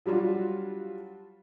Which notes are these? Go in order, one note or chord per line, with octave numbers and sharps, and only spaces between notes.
F#3 G3 D4 F4 F#4